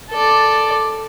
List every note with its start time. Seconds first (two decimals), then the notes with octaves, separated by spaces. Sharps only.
0.11 A4 D5